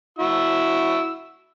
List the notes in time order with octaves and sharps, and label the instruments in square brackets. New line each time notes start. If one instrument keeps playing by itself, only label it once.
[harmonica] E4 F#4 E6